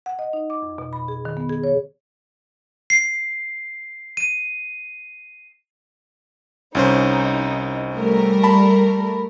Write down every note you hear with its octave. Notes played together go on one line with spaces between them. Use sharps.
F#5
D#5
D#4
D6
F2
B2
B5
G#4
D#3
B3
G#4
C#5
C7
D#7
C2 C#4 D#4 C5
G3 A3 A#4
A5 B5